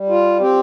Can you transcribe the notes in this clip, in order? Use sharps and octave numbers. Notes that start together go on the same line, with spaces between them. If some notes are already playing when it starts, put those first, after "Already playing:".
Already playing: G3
F4
C4 G4